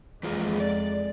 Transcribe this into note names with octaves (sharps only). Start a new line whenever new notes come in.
F2 E3 G#3 F4 G#4
D5